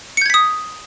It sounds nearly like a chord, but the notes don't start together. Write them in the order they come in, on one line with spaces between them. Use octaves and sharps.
C#7 G6 G#6 B6 D#6